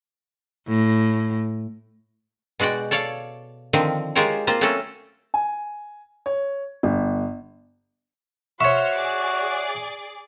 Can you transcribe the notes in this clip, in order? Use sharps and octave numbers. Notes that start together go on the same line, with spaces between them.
A2
B2 G#3 F#4 D5 G5
A4 C#5 D5 F5
D3 D#3 F3 C4
G#3 F4 G4 A#4 C5 C#5
A#3 C4 F4 C5
F#3 A3 C4 C#4 A4
G#5
C#5
G1
F#4 C5 C#5 E5 C#6 F6 C#7
G#4 D5 D6